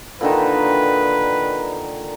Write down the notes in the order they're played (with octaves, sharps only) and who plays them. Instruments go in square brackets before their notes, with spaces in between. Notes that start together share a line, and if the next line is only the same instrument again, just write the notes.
[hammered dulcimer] A#2 D3 D#3 [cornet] B4